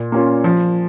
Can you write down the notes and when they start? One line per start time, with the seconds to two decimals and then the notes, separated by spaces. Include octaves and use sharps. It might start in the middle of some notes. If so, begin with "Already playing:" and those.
Already playing: A#2
0.12 A#3 C#4 F4
0.44 F3